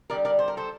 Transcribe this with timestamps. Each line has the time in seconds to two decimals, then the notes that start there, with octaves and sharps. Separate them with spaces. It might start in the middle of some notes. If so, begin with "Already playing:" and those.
0.10 D3 G3 A#4 D5
0.25 A#4 D5
0.39 C5
0.48 A#4
0.57 A4 C5